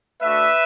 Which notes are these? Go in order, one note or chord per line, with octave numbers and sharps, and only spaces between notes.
A3 D4 F#4 B4 E5